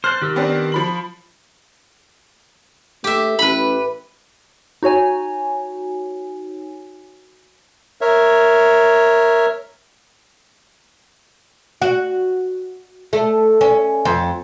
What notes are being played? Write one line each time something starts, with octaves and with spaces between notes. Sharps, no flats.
C5 F6 F#6 A6
D#3 G4 E6
B3 C4 D4
F3 B5 F#7
A3 G4 E5
A1 B4 B5
D#4 F#4 C#5 G#5
A#4 C#5 E5
F#4
A3
C#4
F2